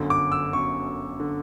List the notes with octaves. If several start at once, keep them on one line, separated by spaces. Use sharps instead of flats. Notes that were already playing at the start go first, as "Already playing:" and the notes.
Already playing: G1 F#2 D3
D6
E6
G1 F#2 D3 C#6
D3